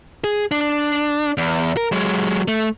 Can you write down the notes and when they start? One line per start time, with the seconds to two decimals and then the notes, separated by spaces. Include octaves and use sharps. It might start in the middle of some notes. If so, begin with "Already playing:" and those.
0.24 G#4
0.51 D4
1.38 E2
1.77 A#4
1.92 F#3 G#3
2.48 A3